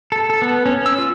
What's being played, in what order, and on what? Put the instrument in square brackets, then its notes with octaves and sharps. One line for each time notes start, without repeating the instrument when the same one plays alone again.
[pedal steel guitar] A4
A4
B3
C#4
E6
F4